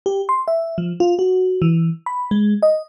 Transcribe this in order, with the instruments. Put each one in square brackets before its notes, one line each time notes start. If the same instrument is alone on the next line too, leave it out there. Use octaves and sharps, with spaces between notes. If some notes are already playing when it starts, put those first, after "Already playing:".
[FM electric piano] G4
C6
E5
F3
F4
F#4
E3
B5
G#3
D#5